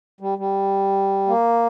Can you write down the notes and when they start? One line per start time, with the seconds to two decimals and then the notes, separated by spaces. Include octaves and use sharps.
0.20 G3
0.38 G3
1.27 A#3